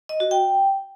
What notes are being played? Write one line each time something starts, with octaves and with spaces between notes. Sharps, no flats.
D#5
F#4
G5